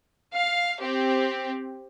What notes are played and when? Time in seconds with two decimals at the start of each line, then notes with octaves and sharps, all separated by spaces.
0.33 F5
0.81 C4 G4